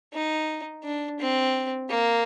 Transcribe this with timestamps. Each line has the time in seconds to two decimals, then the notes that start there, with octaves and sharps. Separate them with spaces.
0.13 D#4
0.84 D4
1.20 C4
1.90 A#3